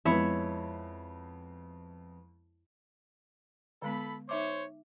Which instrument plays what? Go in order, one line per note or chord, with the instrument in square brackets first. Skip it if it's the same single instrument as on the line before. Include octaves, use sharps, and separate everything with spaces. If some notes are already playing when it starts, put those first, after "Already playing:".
[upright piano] F2 G#3 B3 [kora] E4 C#5 E5
[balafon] D3 G#3 B3 [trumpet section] A4 B5
[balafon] D#4 E5 D6 [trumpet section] C5 C#5